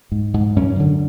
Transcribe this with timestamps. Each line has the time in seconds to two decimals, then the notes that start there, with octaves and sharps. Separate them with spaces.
0.12 G#2
0.34 G#2
0.56 F#2 C#4
0.80 D3